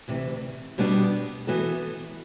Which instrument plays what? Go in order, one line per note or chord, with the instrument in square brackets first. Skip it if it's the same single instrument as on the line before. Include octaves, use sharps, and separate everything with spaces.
[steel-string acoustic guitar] D2 C3 E3
B2 G3 B3 D4 G4
E3 B3 F#4 A4